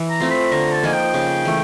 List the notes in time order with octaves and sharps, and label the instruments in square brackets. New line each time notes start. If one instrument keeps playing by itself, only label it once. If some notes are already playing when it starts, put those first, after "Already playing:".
Already playing: [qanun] E3
[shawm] A#5
[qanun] A3 C4 F4
[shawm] B5
[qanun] D3 [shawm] A#5
[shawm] A5
[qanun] F3 A#3 D#4 [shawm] G#5
[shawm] G5
[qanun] C#3
E3 A3